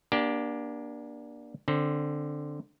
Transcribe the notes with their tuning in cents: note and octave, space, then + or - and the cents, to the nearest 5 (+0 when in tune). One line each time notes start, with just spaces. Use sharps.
A#3 +35 D4 +0 G4 +0
D3 +10 C4 +20